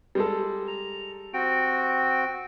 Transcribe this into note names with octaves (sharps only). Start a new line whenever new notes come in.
G3 G#3 A4
A#5
C4 F#4 G5